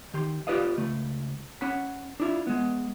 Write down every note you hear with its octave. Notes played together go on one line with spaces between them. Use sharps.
D#3 G4 C6
F4 G4 B4 D5 D#5 F5
C#2 A3
C#4 F#5 B5
D4 E4 F4
G#3 B3